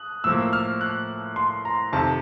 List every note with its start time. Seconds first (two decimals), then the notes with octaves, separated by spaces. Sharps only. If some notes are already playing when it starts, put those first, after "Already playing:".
Already playing: D#6 F#6
0.24 A2 F3 A#3 E6
0.53 F6
0.81 F#6
1.36 C6
1.65 A#5
1.93 F2 C3 D#3 A5